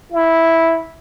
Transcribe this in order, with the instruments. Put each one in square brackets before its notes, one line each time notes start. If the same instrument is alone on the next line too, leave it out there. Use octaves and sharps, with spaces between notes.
[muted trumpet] E4